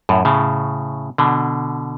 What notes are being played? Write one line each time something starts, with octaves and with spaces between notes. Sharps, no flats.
F#2 A2
A2 C#3
B2 D3